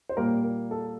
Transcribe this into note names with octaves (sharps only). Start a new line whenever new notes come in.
C5
A#2 G3 A#3 A#4
A#4
A4